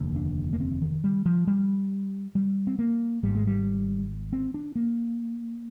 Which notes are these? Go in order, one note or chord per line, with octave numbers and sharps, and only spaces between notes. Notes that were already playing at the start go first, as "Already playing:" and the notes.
Already playing: F1 D#2 D3
D4
A#3
C4
D#3
G3
F3
G3
G3
C4
A#3
G#1 G#2 G3
G#3
G3
C4
D4
A#3